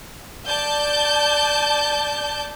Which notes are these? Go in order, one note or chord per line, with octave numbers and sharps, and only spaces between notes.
D5 A5 G6